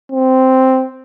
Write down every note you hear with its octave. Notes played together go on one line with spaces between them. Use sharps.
C4